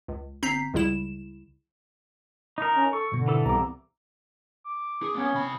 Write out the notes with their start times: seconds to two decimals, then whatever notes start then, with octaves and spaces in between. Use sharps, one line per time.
0.08 C#2
0.43 G1 C4 A#5 G6 B6 C7
0.74 C#2 C#3 G3 E4 E7
2.58 D#4 A#4
2.76 C#4
2.93 A4 C#6
3.12 G#2 B2 D3
3.28 E3 A4
3.46 C2 B3 A#5 D6
4.64 D6
5.03 G#4
5.15 A#3 B3 C#4
5.34 C3 B5